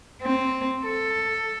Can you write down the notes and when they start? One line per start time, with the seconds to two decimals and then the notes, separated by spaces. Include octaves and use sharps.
0.22 C4
0.84 A4